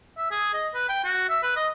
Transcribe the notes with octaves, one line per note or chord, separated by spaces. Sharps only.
E5
G#4
D#5
B4
G5
F#4
E5
B4
D#5